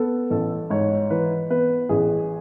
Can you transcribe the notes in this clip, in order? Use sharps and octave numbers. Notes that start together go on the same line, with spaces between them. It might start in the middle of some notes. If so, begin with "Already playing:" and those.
Already playing: B3 A4
A1 A4
G#2 C#5
E3 B4
B3 B4
A1 G#4